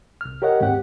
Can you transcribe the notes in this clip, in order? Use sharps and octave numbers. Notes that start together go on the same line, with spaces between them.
C2 F6
G4 A#4 C#5 D#5 F#5
D#2 G#2 C4 G4 F#5